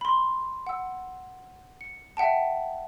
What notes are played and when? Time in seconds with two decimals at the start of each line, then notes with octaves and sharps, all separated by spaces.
0.01 B5 C6
0.67 F#5 E6
1.81 C#7
2.17 E5 F#5 G5 A5